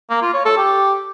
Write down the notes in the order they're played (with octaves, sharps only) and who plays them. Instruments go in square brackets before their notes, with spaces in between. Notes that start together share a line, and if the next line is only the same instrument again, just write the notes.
[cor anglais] A#3
F4
C#5
A4
G4